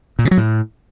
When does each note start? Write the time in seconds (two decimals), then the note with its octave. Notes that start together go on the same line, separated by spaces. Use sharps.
0.19 A#2
0.25 C#3
0.31 F#3
0.37 A2